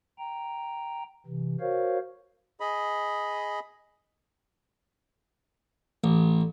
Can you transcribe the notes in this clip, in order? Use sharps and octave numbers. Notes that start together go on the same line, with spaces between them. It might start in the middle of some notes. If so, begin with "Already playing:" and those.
G5 A#5
C3 E3
F#4 A#4 C5 C#5 F5
G#4 D#5 B5
A1